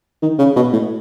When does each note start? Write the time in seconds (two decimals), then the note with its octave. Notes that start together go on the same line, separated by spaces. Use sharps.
0.22 D#3
0.39 C#3
0.56 B2
0.73 A2